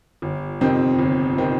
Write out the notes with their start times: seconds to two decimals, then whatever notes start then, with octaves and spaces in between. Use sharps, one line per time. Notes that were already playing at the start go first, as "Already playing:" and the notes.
0.22 G1
0.61 F2 C3 D#3 C4
0.99 G1
1.38 C3 D#3 C4